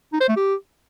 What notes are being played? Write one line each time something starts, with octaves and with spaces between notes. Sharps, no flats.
D#4
C5
A3
G4